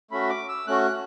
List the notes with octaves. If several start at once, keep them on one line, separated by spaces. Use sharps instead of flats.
A3 C#4 F#4 B5
D6
E6
A3 C#4 F#4 F#6